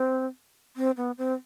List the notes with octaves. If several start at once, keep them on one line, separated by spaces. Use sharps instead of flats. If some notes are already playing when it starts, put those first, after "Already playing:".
Already playing: C4
C4
B3
C4